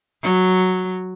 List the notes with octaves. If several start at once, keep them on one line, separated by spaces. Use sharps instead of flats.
F#3